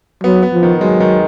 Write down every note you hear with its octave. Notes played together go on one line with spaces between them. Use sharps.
F#3 B3
B3
F3
D#3
F#3 G#3
D#3